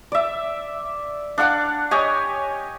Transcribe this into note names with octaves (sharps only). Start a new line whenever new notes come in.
D5 E5
D4 F5 F#5 D6
G4 C#5 D#5 G#5